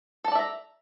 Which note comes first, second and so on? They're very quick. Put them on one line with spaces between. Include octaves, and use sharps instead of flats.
A4 A5 D5 E5 A#5